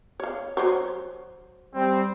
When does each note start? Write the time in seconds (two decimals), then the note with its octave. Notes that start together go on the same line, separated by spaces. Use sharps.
0.20 C#5 F5
0.57 F#3 C5 C#5
1.74 G3 C4